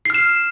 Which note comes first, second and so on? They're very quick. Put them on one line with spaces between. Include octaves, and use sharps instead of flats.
C7 F6 E7